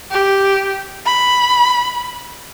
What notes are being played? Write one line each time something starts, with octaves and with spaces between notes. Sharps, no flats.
G4
B5